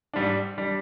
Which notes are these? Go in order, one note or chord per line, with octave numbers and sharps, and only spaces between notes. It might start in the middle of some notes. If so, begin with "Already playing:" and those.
G#2 G3 D4
G3 D4